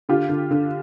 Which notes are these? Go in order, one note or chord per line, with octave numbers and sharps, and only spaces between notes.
D3 F4 G4
D3
D3